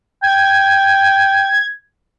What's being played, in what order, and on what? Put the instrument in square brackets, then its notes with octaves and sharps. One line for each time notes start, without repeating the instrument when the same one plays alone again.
[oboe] G5 [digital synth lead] G#6